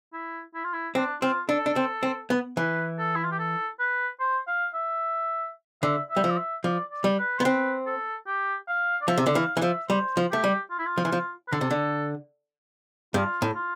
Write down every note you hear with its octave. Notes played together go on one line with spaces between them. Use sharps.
E4
E4
F4
E4
C4 D4
C4 F4
D4 A4
D4
C4
C4
B3
E3 B4
A4
E4
F4
G4
A4
B4
C5
F5
E5
D3 E5
E5
G3
F3
D5
E5
F3 D5
D5
G3
B4
B3 C5
C4 B4
A4
G4
F5
D5
F3 E5
C3
D3
E3 F5
E3
F3 E5
G3 C5
F3
A3 G4
G3
F4
E4
F4
F3
E3
F3
B4
D3 A4
C3
D3
G2 F4
A2
F4